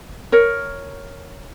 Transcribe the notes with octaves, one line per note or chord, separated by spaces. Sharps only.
A#4 C#5